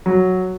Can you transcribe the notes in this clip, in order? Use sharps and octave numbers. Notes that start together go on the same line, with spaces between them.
F#3